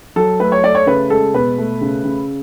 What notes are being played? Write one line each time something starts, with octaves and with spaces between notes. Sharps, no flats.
F#3 A4
A3 B4
C#5
A3 D5
C#5
C#3 B4
G#3 A4
B2 B4
A3
C#3
C#3